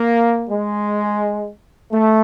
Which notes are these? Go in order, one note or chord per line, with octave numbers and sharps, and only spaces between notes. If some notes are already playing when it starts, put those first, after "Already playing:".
Already playing: A#3
G#3
A3